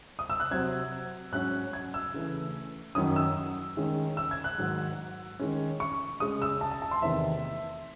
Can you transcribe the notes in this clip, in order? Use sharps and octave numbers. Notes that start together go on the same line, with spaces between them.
D#6
E6
F#6
C3 F#3 C4 G#6
G#2 F#3 C#4 F#6
G#6
E6
C#3 E3 A3
F#2 D#3 F#3 C#4 D#6
E6
D#3 G#3 C#4
E6
G#6
F#6
G#2 D#3 F#3
D#3 G#3 C#4
C#6
C#3 G#3 C#4 D#6
E6
A5
A5
A5
C6
E2 C3 D#3 A3 E5